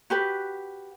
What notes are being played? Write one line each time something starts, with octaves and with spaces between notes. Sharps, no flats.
F#4 G4 B4